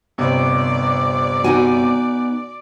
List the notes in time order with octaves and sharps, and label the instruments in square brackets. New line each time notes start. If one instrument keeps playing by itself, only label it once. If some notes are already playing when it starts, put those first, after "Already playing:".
[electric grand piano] G1 C3 [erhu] D5
[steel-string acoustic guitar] B3 D#4 G#5 [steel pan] F#4